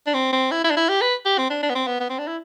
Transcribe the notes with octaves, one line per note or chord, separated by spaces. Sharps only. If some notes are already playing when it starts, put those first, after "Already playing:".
D4
C4
C4
E4
E4
D4
E4
G4
B4
G4
C4
D4
D4
B3
C4
B3
B3
C4
D4
E4